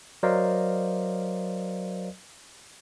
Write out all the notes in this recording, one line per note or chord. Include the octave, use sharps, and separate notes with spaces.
F#3 A#4 C5 D5 D#5 F5